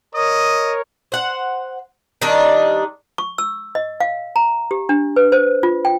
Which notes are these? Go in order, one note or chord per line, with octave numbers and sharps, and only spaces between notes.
A#4 C#5 D#5 D#6
C5 F#5
D#3 G3 D4 D#4
C#6
E6
D#5
F5
A#5
G4
D4
B4
C5
F4
G5